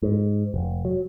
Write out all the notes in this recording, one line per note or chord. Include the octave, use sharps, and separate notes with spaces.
G#2
F1
F#3